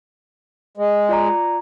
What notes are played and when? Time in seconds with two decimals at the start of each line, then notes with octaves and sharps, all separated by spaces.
0.77 G#3
1.09 F4 D5 A#5